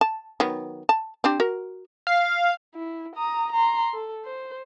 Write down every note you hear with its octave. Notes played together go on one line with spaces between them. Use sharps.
A5
D#3 F#3 B3
A5
C4 D4 G4
F#4 A#4
F5
E4
A#5 D#6
A#5 C6
A4
C5